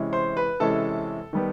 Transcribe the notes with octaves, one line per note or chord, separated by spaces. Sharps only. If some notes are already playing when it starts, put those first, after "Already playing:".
Already playing: C3 E3 G#3 C#4
C5 C6
B4 B5
C3 E3 G#3 C#4 A4 A5
D#3 G3 B3